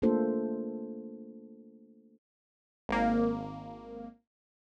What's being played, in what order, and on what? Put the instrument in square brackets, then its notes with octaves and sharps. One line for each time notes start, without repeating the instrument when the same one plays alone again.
[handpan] A3 A#3 D4 F4 A4 C5
[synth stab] G#1 A#3